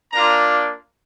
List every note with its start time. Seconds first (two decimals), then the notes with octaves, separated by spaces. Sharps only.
0.12 A#3 D4 F4 A#5